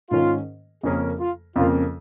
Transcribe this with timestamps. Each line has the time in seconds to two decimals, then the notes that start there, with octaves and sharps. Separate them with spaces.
0.11 G#2 D#3 C#4 F4 A#4
0.83 F2 C#3 A#3 C#4 G#4 A#4
1.20 F4
1.56 F2 C#3 A#3 F4